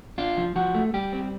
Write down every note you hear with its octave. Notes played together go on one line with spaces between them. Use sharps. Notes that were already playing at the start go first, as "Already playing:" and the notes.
D4 F4
F3
F3 F#4
A3
G3 G4
C4